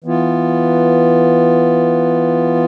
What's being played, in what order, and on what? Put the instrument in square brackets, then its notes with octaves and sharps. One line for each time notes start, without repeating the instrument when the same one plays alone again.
[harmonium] E3 B3 F4